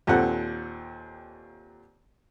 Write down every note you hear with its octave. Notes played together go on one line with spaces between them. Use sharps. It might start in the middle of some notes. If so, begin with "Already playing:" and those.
D#2 A#2 C4 A4 F#5